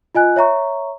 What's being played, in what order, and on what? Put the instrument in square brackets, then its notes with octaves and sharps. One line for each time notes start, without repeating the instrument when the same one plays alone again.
[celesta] F4 D#5 G#5 F#6
C#5 E5 A#5 C#6